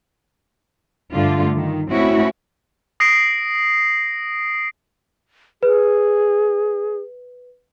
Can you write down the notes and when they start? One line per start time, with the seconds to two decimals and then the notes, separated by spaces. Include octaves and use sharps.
1.13 G2 D3 A3 F4
1.56 D#3
1.90 A3 C4 C#4 E4 F#4
3.00 D#6 A#6 C7 D7
5.63 G#4 B4